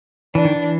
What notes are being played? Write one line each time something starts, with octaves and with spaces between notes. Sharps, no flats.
E3 D4
D#3
E3